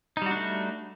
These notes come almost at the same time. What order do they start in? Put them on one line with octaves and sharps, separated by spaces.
D#4 G3 F#4 D4 A3